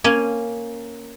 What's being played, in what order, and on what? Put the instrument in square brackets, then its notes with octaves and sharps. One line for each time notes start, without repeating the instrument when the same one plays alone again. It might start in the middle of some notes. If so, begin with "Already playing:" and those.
[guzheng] A#3 C#4 G#5